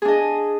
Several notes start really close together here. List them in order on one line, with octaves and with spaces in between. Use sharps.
G#4 D4 D#5